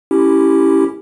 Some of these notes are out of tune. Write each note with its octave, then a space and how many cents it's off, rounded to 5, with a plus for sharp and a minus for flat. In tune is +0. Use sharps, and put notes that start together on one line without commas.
C#4 +0 E4 +0 G4 +0